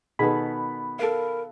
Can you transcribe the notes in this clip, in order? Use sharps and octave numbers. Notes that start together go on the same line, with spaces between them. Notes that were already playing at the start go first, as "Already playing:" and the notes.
B2 D#3 B3 G#4 A4 B5
A4 A#4 F5